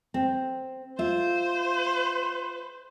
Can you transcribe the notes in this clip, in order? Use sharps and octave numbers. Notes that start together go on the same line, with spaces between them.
C4
F4 C5 E5